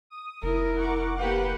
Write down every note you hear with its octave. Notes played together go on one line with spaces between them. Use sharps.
D#6
F1 E4 A#4
F#5 C#6 D6
A#3 G4 B4 F#5 G6